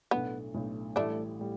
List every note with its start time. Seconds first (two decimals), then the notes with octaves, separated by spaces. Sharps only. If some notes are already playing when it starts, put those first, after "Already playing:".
0.11 B1 A2 A3 B3 D4
0.54 B1 A2 A3 D4
0.96 A1 A2 G3 A3 D4 E4
1.39 A2 G3